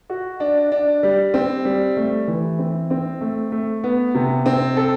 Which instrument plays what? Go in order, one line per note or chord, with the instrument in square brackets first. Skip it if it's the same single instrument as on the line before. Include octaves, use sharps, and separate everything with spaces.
[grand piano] F#4
D4
D4
G3
C4
G3
A3
E3
C4
C4
A3
A3
B3
C3
C4
A4